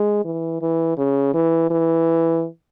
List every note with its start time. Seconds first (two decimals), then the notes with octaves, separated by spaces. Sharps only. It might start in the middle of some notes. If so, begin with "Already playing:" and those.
Already playing: G#3
0.25 E3
0.62 E3
0.98 C#3
1.34 E3
1.70 E3